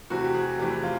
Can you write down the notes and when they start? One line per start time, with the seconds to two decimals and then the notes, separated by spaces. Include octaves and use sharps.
0.10 E2 C3 E3 A3 F#4
0.24 G4
0.34 G#4
0.59 E2 C3 E3 A3 G4
0.84 F4